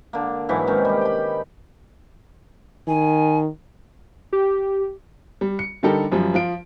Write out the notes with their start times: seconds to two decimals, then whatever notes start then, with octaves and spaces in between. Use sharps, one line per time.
0.13 D3 A#3
0.49 G#2 E3 F#3
0.67 C3 D#3 C#4
0.85 G3 G4
1.01 G5 B5
2.88 D#3 G#5
4.33 G4
5.41 G3
5.59 C#7
5.83 D3 G3 D#4 G4 A4 A#4
6.12 F#2 F3 G3
6.34 F3 F4 D7